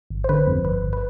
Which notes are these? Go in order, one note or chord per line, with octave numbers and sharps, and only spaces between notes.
G#1
C5
D3 B4
F2
G1 B4
G1
B4